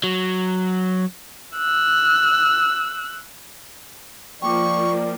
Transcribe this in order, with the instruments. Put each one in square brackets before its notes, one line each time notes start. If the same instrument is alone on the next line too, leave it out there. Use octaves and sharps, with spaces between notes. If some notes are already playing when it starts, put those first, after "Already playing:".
[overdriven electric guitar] F#3
[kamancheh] E6 F#6
[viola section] F3 A#3 [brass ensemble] D5 [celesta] G5 D6 [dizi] C#6